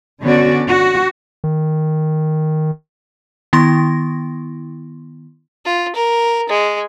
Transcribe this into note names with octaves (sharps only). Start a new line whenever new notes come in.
D3 B3 C#4 F#4 D5
F#4
D#3
D#3 B3 E4 C6 A#6
F4
A#4
G#3